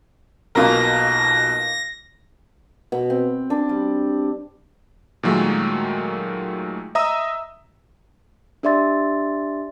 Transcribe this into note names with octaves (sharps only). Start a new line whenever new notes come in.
B1 B2 A#3 F4 A#4 A#6
B2
C4
D4
G3
A#2 D#3 F#3 G#3 A3
D#5 E5 A#5 D#6 E6
D4 G4 D5 E5 C6 A6